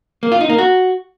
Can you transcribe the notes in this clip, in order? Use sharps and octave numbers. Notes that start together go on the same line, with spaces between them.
A#3
F4
D#4
A#3
F#4